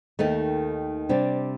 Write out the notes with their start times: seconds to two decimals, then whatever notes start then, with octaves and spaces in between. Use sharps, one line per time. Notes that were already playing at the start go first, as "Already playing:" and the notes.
0.19 D#2 D#3 A3 D#4
1.09 C3 G3 D4